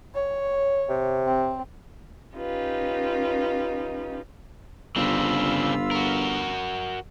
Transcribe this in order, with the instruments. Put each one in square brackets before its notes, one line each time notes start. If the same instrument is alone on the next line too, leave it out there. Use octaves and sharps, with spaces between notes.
[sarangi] C#5
[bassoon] C3
[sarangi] C4
[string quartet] C#4 D#4 F4 G4 B4
[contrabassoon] G1 [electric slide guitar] C#3 C4 D4 [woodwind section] F4 B5 E6
[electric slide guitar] F#4 A#4